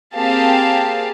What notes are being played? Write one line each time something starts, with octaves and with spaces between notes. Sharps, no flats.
A#3 C4 G4 G#4 F5 A5